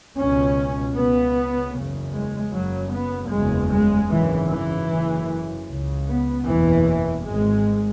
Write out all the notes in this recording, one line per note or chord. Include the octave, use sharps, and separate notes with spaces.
C#2 B2 C#4
C#2 C#3 B3
F#1 E2 C#3
G#3
F#1 F#2 C#3 F#3
B3
F#1 E2 C#3 G#3
G#3
G#1 F#2 C#3 E3
E3
F#1 F#2 C#3
C#2 C#3
B3
F#1 E2 B2 E3
G#1 G#2 G#3